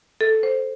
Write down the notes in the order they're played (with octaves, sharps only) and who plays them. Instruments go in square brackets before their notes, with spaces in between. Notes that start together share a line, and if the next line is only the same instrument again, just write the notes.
[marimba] A4
C5